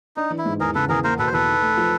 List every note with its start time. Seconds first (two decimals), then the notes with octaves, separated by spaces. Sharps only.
0.16 D4 D#4
0.30 E3
0.38 E4
0.45 G#2
0.60 E2 G#4 A#4
0.75 C#3 A4 B4
0.89 E2 G#4 A#4
1.04 A#3 A#4 C5
1.19 B2 A4 B4
1.27 C5
1.33 E2 A4 B4
1.48 D#4
1.62 A3
1.77 F3